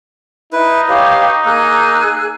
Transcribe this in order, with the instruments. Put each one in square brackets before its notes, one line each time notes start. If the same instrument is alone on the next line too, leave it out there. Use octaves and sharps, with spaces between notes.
[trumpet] D#4 [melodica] E4 B4
[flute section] G4 C#5 F5 [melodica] B4
[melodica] A#3 [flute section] G#4 E6 F#6